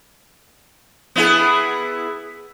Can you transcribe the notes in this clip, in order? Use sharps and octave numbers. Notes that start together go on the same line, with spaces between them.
B3 E4 G#4